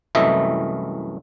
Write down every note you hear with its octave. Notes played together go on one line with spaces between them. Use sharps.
C2 F#2 E3 A3 D#5 E5